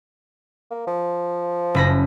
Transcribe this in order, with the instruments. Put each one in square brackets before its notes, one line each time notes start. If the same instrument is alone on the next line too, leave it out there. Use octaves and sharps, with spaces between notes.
[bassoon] A#3
F3
[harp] F#1 B5 A#6